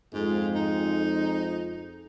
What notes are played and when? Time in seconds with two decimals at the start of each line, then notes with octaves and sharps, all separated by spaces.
0.14 F2 G#2 G#3
0.56 D#4